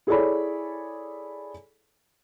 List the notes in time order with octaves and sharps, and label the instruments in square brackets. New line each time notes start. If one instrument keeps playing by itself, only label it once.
[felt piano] E4 G#4 A4 C#5 D5 B5